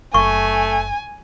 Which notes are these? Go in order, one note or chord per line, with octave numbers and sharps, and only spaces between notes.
F#1 A3 G#5 C#6